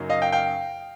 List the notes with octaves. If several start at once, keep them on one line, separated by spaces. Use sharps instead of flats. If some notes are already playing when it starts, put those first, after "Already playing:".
Already playing: F#2 C#3 F#3 A#3 D#4
D#5 F5
F5 G5
F5 G5